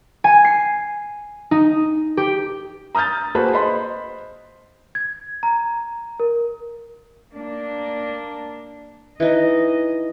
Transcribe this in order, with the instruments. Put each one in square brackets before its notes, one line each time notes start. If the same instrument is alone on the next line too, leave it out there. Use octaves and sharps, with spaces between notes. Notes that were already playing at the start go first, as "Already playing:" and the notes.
[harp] G#5
C7
D#4
G4
[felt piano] A#5 D#6 F6 G6 A6
A#3 F#4 G#4 B4 C5 A5
C5 D#5 B5 C6
[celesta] G#6
A#5
A#4
[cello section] A#3 D4
[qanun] E3 D#4 [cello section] D#5